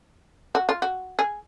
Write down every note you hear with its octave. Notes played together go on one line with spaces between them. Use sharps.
F#4
F4
F#4
G#4